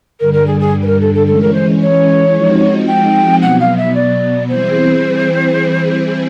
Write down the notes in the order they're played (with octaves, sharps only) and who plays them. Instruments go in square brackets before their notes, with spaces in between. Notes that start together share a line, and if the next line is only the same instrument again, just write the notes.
[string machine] G2 D3 G3 [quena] A#4
[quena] A#4
G#4
G#4
B4
A#4
A4
A4
[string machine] E3 G#3 C#4 [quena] A4
[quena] A#4
C5
C#5
[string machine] F3 G#3 C4 D#4 F#4
[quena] G5
[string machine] B2 F#3 B3 [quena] F#5
[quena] F5
E5
D5
[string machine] E3 G3 C4 E4 G#4 [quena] C5